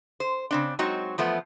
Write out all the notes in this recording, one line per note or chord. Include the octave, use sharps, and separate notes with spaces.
C5
C#3 C4 D4
F#3 G#3 C4 D#4 F#4
E2 F3 A3 B3